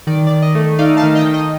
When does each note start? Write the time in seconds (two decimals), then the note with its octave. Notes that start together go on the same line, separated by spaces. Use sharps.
0.07 D#3 D5
0.27 D5
0.31 D#3
0.42 D#5
0.55 A3
0.79 D#4 D5 F5
0.97 F5 A5
1.03 D#3
1.15 D#5 G5
1.27 D#3
1.34 D#5